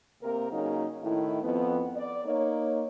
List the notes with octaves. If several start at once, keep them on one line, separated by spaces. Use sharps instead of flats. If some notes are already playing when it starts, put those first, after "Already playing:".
C3 A#3 A#4
C#3 F#3 A#3 D#4
A2 D#3 E4
F2 B3
D5
A#3 D#4 C#5